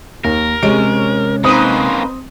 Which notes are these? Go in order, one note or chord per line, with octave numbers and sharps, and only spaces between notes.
D#2 A#4
C3 G#3 C#4 D7
A#3 C4 C#4 D#4 B4 C5 D#6